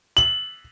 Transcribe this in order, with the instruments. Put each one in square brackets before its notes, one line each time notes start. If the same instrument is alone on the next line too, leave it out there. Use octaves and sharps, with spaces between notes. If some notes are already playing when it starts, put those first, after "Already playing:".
[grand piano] F#7